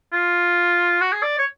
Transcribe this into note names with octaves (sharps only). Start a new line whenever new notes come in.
F4
F#4
G#4
D5
C#5